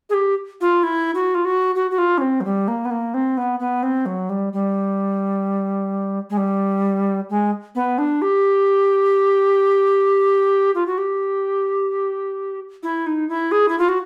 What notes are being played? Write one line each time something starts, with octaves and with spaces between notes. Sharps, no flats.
G#4
G4
F4
E4
F#4
F4
F#4
F#4
F#4
F4
C#4
C4
F#3
G3
A#3
B3
A#3
C4
B3
B3
C4
F#3
G3
G3
G#3
G3
G#3
B3
D4
G4
F4
F#4
G4
E4
D#4
E4
G#4
E4
F4
F#4